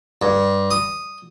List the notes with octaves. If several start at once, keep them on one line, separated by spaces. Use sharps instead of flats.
G2
D#6